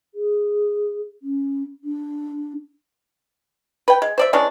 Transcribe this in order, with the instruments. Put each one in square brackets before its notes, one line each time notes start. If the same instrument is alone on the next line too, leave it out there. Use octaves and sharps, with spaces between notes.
[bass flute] G#4
C#4
D4
[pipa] B4 G5
G#3
C5 D5 E5
E3 G#3 C#4 D4